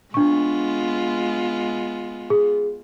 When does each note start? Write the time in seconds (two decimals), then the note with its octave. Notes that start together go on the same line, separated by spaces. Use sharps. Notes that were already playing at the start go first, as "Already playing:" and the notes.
0.14 G#3 B3 D4 F4 C#6
2.30 G#4